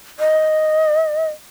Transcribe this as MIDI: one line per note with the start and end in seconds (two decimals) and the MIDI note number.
0.20 1.29 75